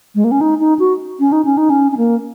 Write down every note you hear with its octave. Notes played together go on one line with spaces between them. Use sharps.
G#3
A#3
C#4
D#4
D#4
F#4
C#4
D#4
C#4
D#4
C#4
C#4
A#3